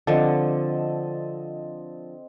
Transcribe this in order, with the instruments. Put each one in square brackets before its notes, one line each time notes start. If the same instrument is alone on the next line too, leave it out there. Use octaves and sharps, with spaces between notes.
[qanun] D3 F3 [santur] C4 D#5 A5